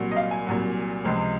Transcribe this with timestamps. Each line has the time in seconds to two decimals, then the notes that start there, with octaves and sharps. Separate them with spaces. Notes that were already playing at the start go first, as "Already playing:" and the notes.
Already playing: C2 A#2 F#3
0.11 D#5
0.16 F5
0.31 G#5
0.46 C2 A#2 F#3
1.05 C#2 C3 F3 G#3